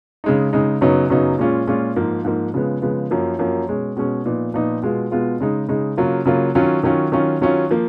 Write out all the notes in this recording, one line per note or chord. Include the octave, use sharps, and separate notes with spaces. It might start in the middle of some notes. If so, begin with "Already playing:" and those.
C#3 G#3 D#4
C#3 G#3 D#4
F#2 C#3 F#3 B3 D#4
F#2 C#3 F#3 B3 D#4
A#2 G#3 C#4 F4
A#2 G#3 C#4 F4
G#2 F3 A#3
G#2 F3 A#3
C#3 F3 G#3 B3
C#3 F3 G#3 B3
F#2 F3 A#3
F#2 F3 A#3
B2 G#3 C#4
B2 G#3 C#4
A#2 F3 B3 D#4
A#2 F3 B3 D#4
B2 G#3 B3 F4
B2 G#3 B3 F4
C#3 G#3 D#4
C#3 G#3 D#4
C#3 F#3 A#3 F4
C#3 F#3 A#3 F4
D#3 F#3 C#4 F4
D#3 F#3 C#4 F4
D#3 F#3 C#4 F4
D#3 F#3 C#4 F4
F3 A#3